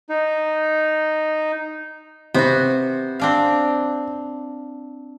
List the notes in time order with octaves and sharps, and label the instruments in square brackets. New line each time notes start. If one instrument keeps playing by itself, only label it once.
[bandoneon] D#4
[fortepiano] C3 C5 [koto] B3 F#4
[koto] C4 D4 F5